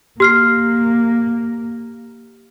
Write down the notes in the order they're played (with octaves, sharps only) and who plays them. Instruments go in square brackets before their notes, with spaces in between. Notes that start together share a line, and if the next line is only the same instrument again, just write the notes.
[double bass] A#3 [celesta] G4 F6 C7